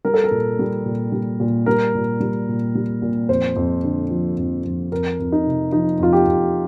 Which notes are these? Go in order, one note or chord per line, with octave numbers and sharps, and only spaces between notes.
G3 A#4
A4
A#4
A#2
G3
A#2
G3
A#2
G3 A#4
A#2
G3
A#2
G3
A#2
F2 C5
F2
D3
F3
F2
F2
F2 A#4
F2
D#4
C3
F3 D#4
F2 F4
G4
F2